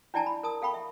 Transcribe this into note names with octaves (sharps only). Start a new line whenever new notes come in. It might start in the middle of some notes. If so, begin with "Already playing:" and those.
D4 E4 D5 G5 A5 A#5
B5
A#4 A5 D#6
A4 F5 G5 B5 C#6
E5